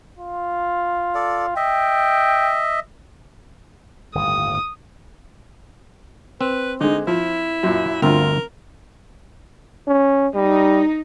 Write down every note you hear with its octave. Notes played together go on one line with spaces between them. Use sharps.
F4
A4 D5
D#5 E5 G5
G1 D#2 A2 D#6
C4 B4
D3 G#3 D#4
F3 E4
F#2 A#2
G1 D2 C4 F4 A#4 E5
C#4
G3 D#4